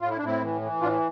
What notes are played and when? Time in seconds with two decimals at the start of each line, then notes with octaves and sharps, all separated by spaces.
0.01 A2 F4
0.10 E4
0.17 D4
0.22 A2 C4 E4
0.41 E3
0.61 E3
0.81 A2 D4 F4